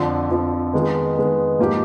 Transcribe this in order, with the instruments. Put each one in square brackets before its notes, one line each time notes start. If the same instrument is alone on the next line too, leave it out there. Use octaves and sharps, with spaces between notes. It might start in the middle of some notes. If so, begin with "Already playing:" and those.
Already playing: [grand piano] F2 D3 F3
F2 D3 F3
D#3 G#3 B3
D#3 G#3 B3
G#2 F3 A#3 D#4 G4